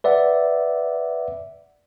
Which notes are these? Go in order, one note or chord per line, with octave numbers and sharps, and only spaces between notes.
B4 D5 E5 F#5